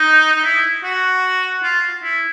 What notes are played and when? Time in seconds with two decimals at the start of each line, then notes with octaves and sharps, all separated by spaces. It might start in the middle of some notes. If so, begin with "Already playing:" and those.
Already playing: D#4
0.33 D#4
0.44 E4
0.84 F#4
1.63 F4
2.03 E4